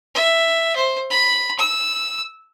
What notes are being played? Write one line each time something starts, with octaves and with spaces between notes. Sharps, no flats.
E5
C5
B5
E6